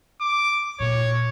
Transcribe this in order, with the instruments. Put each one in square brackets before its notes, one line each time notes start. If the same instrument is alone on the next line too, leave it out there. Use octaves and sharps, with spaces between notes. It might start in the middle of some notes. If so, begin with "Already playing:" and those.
[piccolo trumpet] D6
[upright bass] A#2 A#3 [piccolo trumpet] C#5